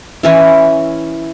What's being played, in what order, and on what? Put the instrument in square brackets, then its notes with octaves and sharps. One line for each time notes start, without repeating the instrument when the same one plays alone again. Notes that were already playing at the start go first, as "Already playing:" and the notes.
[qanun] E3 C#4 E4